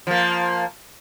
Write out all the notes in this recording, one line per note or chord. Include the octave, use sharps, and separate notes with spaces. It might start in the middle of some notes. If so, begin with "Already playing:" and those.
F3 A#3